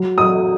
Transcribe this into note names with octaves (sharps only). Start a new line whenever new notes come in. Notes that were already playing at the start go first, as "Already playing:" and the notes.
Already playing: F#3
F#3 D#6